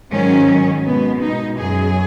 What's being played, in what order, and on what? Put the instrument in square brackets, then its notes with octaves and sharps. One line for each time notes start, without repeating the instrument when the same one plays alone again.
[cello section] G#2 D#3 F#3 C#4
B2 G#3 B3
D#4
F#2 F#3 G#4